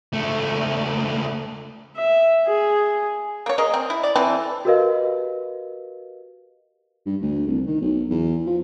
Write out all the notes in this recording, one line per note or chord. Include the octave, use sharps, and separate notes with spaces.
C#2 A3
E5
G#4
A#3 C#5
G#4 A#4 D#5
C4
E4
D5
E3 C4 E4 A4
F#4 G4 A#4 B4 D#5 F5
G2
D2
C2
D#3
B1
E2
F3